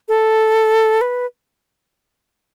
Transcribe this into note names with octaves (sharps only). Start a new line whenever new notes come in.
A4
B4